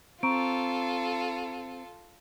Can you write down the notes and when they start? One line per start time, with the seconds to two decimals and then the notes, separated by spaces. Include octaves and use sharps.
0.23 C4 F4 A4 A#5 C#6 D7